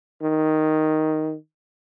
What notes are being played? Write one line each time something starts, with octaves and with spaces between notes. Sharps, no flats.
D#3